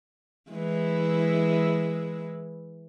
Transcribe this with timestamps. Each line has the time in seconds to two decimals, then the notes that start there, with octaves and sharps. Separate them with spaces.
0.50 E3 G#3 E4